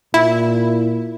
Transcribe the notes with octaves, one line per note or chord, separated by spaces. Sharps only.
A#2 E4